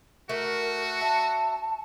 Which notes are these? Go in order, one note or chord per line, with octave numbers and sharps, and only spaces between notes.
A3 F#4 A#4
E5 A5